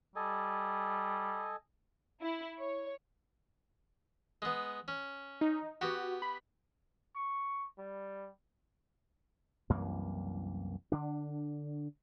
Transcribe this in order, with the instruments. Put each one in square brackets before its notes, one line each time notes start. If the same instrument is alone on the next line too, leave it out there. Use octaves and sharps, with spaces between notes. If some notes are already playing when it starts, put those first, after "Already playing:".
[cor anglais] G3 [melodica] A4 D#5 G#5
[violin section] E4
C#5
[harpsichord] G#3 B3
C#4
[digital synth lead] D#4
[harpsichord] B3 G4 [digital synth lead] F#4
[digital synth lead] B5
[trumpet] C#6
G3
[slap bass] C2 F#2 E3 A#3
D3 D4